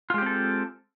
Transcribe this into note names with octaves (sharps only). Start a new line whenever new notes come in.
G#3 C4 F4 G4 A4